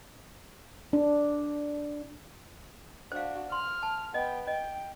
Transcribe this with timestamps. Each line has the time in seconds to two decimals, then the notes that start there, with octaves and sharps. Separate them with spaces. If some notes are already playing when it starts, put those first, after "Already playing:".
0.93 D4
3.12 D4 F#4 C5 F5
3.52 C6 F6
3.83 A5
4.14 B3 D#5 G5
4.47 D#5 G5